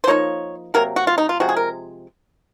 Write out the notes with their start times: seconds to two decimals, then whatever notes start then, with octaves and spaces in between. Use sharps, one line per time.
0.04 C5
0.07 F3 A#3 D#4 C#5
0.74 C3 F#3 A#3 A#4
0.96 F#4
1.07 F4
1.18 D#4
1.29 F4
1.40 C3 F3 G#3 F#4
1.49 G#4
1.56 A#4